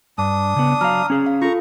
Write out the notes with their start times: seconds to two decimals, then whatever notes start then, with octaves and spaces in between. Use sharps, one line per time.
0.18 G2 D4 D#6
0.56 C#3 B3
0.81 F#3 F5 A#5 F6
1.10 C#4 G#4
1.26 F5
1.42 F4 A4 A#5 C#6